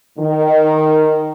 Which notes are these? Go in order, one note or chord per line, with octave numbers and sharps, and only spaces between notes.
D#3